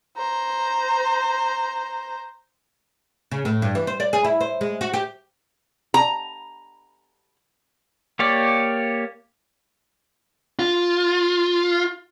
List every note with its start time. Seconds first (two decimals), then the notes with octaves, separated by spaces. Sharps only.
0.17 C5 A#5
3.32 C#3
3.45 A2
3.62 G2
3.75 E3
3.87 C5
4.00 D5
4.13 G#4
4.24 E4
4.41 C5
4.61 G#3
4.81 F#4
4.94 G4
5.94 A#5
8.19 A#3 G4 C#5 D5
10.59 F4